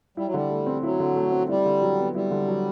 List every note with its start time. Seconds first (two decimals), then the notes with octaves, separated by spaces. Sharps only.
0.17 G3 E4
0.26 F#3
0.34 D3 G3
0.50 A3
0.66 C4
0.83 F#3 E4
1.00 D3
1.16 A3
1.32 C4
1.49 G3 E4
1.65 D3
1.82 F#3
1.99 B3
2.15 G3 E4
2.31 D3
2.48 F#3